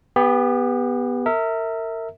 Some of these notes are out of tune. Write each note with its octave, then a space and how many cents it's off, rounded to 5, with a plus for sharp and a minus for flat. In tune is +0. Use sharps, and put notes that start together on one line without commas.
B3 -5 G4 +30
A#4 -30 E5 -20